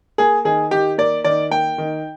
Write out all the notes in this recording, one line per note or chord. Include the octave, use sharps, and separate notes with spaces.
A#3 G#4
D#3 G#4
D#3 G4
A#3 D5
D#3 D5
A#3 G5
D#3